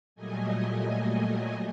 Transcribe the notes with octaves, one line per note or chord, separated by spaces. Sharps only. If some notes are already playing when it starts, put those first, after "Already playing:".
A#2 F#3 G3 A3 D#5 G#5